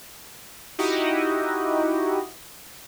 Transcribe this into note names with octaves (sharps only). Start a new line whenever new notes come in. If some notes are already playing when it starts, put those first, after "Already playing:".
D#4 E4 F#4 G4 D#5